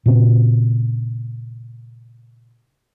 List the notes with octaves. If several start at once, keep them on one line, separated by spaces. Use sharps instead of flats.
A#2 C#3 C4